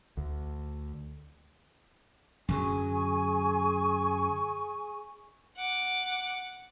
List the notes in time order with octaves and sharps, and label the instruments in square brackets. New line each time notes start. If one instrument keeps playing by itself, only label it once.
[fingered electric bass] D2
[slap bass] F#2 D3 F#3 [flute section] G#4 G#5 C#6
[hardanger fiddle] F#5 D6